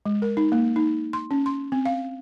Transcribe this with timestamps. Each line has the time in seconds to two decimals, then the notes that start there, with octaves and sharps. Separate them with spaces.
0.06 G#3
0.22 A#4
0.37 D#4
0.52 A#3
0.76 D#4
1.13 C6
1.31 C#4
1.46 C6
1.72 C4
1.86 F5